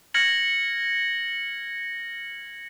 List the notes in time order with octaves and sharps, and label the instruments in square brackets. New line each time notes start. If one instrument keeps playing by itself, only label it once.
[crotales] F6 G#6 A#6 C#7 F#7